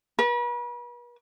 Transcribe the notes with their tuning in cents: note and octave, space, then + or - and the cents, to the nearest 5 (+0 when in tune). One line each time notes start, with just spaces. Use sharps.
B4 -40